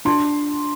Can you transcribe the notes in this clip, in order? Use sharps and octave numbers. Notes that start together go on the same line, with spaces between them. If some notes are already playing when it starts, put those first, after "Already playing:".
D4 C6